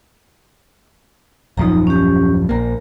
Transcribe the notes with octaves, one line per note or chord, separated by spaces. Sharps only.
D#1 F#2 F3 D#4 A#5
C#4 G4
A#1 A#3 A#4 A#5